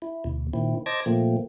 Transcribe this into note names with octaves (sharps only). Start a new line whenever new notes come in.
E4
D2 B2
A#2 D#3 C4 E4
C5 D#5 A5 D6 G#6 A#6
A#2 F3 A3 A#3 C4